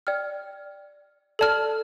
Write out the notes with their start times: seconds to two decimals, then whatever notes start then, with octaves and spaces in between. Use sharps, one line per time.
0.07 D5 G5 F6
1.39 A4 D5 A5 F6